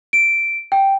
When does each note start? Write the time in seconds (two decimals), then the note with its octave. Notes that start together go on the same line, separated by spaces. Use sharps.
0.13 D7
0.72 G5